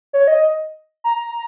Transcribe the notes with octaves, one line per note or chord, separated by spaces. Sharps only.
C#5
D#5
A#5